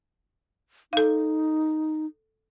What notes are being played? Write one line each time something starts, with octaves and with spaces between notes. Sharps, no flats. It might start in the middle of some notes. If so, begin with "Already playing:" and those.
D#4 A4 F5